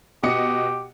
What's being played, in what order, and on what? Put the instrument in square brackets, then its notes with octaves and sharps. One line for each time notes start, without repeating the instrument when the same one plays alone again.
[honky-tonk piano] B2 D#5 C#7 [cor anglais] G4